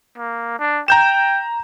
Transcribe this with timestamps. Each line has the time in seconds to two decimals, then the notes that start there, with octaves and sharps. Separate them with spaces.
0.18 A#3
0.59 D4
0.88 G5 A#5 G6 E7